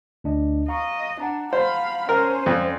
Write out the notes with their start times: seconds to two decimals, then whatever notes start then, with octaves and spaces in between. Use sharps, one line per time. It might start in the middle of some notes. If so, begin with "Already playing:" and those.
0.24 D2 D4 D#5
0.68 D#5 F5 A#5 C#6
1.20 D4 F#5 A5 A#5
1.53 C5 F5 B5
2.09 C#4 A#4 C5
2.46 F2 A4 D5